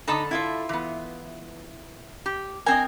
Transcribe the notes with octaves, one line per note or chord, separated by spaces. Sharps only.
D3 D#4 A4 A5 B5 D#6
E4 F4 E5
E3 B3
G4
C4 A#4 D#5 G#5